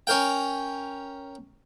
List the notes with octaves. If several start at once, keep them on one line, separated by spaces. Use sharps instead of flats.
C#4 A#4 G5